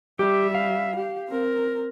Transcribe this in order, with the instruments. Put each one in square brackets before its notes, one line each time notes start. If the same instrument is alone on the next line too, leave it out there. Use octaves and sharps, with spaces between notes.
[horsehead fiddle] G3 E5 [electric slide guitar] G4
[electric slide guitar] F5
[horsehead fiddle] G4
C4 A#4